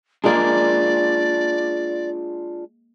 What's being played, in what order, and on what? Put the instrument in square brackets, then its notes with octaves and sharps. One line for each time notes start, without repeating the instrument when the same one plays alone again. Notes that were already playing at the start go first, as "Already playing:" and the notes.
[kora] G#3 A#3 [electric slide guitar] D4 F4 G#4 [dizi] D5